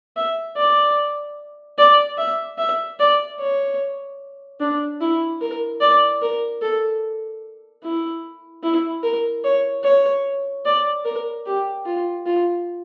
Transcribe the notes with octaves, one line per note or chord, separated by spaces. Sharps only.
E5
D5
D5
E5
E5
D5
C#5
D4
E4
A#4
D5
A#4
A4
E4
E4
A#4
C#5
C#5
D5
A#4
G4
F4
F4